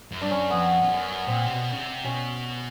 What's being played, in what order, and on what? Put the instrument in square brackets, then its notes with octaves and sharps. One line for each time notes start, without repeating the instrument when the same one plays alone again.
[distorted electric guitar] F#2
[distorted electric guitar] G2 [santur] D4
[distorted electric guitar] F#2 [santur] C#4
[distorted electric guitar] F2 [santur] B3
[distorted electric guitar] F2
F#2
[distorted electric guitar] A#2 [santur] C4
[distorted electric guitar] C3
B2
C#3
C3
[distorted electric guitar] B2 [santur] C#4